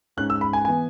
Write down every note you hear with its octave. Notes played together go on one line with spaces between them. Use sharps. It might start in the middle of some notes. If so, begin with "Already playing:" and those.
G#2 G#3 C#4 F#6
E6
B5
G#5
E3 B3 G#5